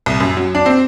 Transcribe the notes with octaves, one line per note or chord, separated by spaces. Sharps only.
C2
F#2
F#3
D4
C4